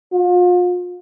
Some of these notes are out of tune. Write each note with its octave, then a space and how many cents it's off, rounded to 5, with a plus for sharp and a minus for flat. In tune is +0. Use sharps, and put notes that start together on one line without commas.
F4 +40